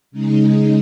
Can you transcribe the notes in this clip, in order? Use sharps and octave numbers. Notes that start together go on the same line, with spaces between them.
C#3 G#3 D#4